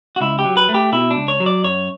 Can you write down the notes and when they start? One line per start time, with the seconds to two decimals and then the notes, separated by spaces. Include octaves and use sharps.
0.16 F#4
0.21 C#2 E4
0.39 G4
0.45 F#3
0.57 B4
0.69 A3
0.74 G4
0.92 B2 E4
1.11 D4
1.16 C#2
1.28 C#5
1.40 F#3
1.46 D5
1.64 F#2 C#5